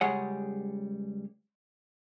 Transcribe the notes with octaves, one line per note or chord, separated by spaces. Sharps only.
C#2 G3 G#3 G#4 C#5 F#5